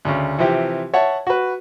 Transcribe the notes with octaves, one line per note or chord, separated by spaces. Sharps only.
D2 C#3
C3 E3 F3 C4 G4
C#5 E5 F#5 A5
F#4 B4